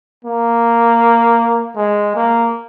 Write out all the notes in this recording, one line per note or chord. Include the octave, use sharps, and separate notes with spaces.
A#3
G#3
A#3